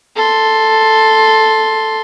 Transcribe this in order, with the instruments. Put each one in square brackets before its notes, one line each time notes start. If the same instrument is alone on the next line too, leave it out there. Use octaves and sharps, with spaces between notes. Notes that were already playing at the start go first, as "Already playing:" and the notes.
[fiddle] A4 C6